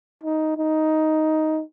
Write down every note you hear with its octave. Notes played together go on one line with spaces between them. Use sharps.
D#4
D#4